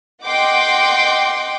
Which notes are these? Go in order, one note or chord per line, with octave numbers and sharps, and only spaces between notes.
D#5 F#5 G5 C6 D6